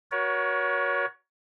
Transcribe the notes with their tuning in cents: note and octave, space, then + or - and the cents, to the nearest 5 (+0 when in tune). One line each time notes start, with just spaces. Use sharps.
F#4 +0 A#4 +40 C#5 +20